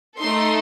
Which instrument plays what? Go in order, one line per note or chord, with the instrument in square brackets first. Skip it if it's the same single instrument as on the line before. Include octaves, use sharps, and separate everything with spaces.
[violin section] A3 D#4 A4 C6